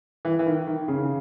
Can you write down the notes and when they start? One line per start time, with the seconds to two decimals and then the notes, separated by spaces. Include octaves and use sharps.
0.25 E3
0.39 E3
0.46 D#3
0.67 D#3
0.88 C#3